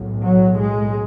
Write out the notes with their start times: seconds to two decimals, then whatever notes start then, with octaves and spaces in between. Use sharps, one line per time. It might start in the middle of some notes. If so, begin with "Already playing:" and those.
Already playing: B1 A2
0.24 F#3
0.60 G#3